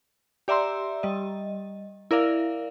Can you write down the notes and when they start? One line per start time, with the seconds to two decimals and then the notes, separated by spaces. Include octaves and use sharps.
0.48 G4 D5 E5 A#5 C6 E6
1.03 G3 D#5
2.11 E4 A#4 D5 F5